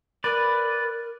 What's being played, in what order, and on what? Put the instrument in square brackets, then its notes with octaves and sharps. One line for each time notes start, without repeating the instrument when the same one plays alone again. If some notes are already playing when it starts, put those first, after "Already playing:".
[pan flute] A#4 [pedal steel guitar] B4 D5